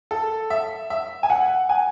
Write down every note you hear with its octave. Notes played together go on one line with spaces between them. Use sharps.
A4
E5
E5
G#5
F#5
G#5